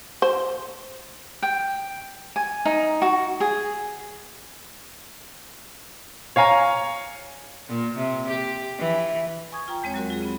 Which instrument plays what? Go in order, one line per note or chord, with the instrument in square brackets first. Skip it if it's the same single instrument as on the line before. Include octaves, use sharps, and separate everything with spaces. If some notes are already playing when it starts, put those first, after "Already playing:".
[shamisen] C5
[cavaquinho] G5
G#5
D#4
F#4
G#4
[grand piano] C#5 F5 G#5 A#5
[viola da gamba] A#2
C3
G4
E3
[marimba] G#5 C#6 D#6 G#6
F4 G5 A#5
E2 G#3 C4 C#5
F#3 F#4 A#4
F4 G#4
C4 B5